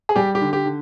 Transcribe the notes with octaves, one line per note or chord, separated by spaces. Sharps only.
G#4
G3 G4
G4
D3
G4
D3